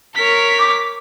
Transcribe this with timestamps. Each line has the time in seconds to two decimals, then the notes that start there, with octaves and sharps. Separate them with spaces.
0.15 A#4 C#5 B6
0.59 D6